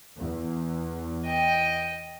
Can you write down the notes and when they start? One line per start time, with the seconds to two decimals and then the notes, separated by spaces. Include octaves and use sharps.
0.20 E2
1.26 D#5 G5